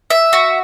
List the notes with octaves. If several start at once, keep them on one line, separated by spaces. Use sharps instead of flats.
E5
F#4